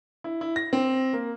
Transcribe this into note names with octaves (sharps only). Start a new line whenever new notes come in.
E4
E4
A#6
C4
A#3